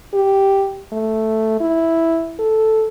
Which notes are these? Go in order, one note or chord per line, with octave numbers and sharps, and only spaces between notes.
G4
A3
E4
A4